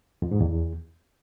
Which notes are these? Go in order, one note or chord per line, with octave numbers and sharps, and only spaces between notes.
F2
G#2
E2